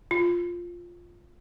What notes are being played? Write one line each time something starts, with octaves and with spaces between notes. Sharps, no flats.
F4